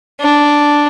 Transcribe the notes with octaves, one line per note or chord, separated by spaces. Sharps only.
D4